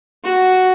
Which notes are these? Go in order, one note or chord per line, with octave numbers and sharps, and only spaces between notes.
F#4